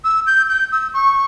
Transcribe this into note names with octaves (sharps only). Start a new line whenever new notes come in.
E6
G6
G6
E6
C#6